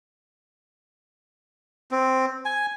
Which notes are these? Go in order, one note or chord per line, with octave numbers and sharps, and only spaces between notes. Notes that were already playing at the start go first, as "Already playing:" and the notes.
C4
G#5